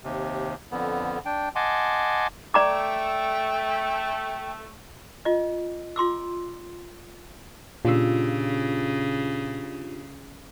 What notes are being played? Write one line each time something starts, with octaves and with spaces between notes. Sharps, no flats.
D#2 C3
F2 D3 B3
D4 G5
D#5 F#5 G#5 A5 C6 D6
A3 D5 G5 A#5 D6
F4 D#5
F4 C6 D6 E6
A#2 C#3 D4 F4 G4 E6